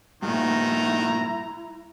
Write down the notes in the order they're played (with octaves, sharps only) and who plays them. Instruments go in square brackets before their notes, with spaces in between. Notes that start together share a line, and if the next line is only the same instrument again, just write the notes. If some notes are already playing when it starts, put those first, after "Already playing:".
[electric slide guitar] G2 A#2 [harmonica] D#3 A3 F#4 [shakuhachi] E4 [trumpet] A#5